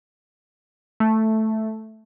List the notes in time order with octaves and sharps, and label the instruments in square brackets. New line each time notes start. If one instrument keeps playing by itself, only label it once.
[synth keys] A3